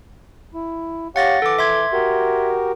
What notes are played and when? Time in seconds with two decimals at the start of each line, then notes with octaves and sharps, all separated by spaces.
0.54 E4
1.16 G4 C#5 F5 F#5 A6 A#6
1.42 E3 A4 D6
1.59 E5 C6 G#6
1.93 F#4 G4 A#4